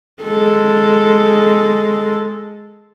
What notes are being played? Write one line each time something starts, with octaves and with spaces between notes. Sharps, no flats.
G#3 A4